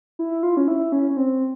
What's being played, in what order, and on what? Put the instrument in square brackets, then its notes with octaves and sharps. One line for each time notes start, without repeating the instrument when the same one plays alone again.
[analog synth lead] E4
F4
C#4
E4
C#4
C#4
C4